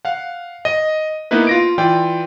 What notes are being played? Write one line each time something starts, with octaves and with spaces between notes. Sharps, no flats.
F5 F#5
D#5
A#3 B3 D#4 E4 B4
F4 A#6 D7
E3 F4 D5 G5